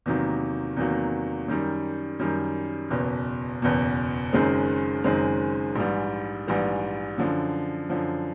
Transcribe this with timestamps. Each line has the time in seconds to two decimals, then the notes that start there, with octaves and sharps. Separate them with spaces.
0.06 E2 C3 D#3 F#3 A#3
0.77 E2 C3 D#3 F#3 A#3
1.48 F#2 D#3 G3
2.19 F#2 D#3 G3
2.90 F#1 E2 B2
3.62 F#1 E2 B2
4.33 F#1 F#2 D#3 G#3 C4
5.04 F#1 F#2 D#3 G#3 C4
5.76 A#1 G#2 E3 G3
6.48 A#1 G#2 E3 G3
7.18 F#2 D3 F3
7.89 F#2 D3 F3